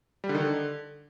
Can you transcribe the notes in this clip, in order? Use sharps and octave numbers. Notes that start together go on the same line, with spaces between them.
G3
D3
D#3
D3